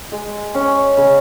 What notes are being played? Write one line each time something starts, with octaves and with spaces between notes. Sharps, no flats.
G#3
C#4
C#3